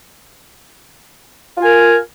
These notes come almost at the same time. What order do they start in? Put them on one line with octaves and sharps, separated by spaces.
F4 G#5 A#4